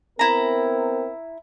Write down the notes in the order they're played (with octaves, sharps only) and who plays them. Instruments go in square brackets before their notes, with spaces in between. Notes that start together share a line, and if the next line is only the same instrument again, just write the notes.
[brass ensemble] B3 C4 A#4 [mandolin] E4 A#5